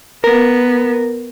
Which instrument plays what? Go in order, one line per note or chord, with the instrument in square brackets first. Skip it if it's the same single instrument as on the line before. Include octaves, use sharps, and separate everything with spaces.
[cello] B3 [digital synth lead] A#4